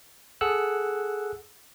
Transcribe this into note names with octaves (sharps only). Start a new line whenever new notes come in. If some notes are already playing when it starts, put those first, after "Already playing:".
G#4 A4 F#5 E6 F#6